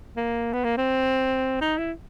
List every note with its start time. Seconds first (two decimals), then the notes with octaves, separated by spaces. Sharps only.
0.16 A#3
0.53 B3
0.64 A#3
0.77 C4
1.61 D#4
1.78 E4